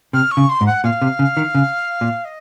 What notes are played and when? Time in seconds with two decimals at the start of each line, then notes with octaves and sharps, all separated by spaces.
0.13 C3 F6
0.31 C#6
0.37 C#3
0.49 C6
0.61 G#2
0.67 F#5
0.84 A#2 F5
1.02 C3
1.19 C#3
1.37 D#3
1.55 C#3
2.01 A#2
2.25 D#5